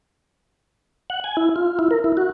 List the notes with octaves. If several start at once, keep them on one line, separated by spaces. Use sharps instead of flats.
F#5
G#5
E4
F4
E4
A#4
E4
F#4